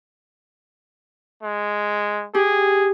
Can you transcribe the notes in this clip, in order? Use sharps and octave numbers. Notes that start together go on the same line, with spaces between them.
G#3
G4 G#4